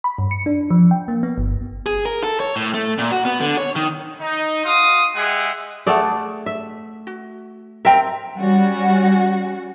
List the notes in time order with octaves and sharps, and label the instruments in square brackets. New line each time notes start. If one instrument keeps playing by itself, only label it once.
[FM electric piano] B5
G2
C#7
D4
F3
G5
A#3
B3
G1
[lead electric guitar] G#4
A#4
A4
C#5
A2
A3
A#2
F#4
B3
D3
C#5
D#3
[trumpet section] D#4
F#4 F5 C6 D#6
G#3 G4 G#4 E5 F#5
[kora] A3 D5 [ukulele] G#4 A4 F#5
[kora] E5
[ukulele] F#4
[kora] C4 A#4 [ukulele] E5 G5 A#5
[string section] G3 C#4 F#4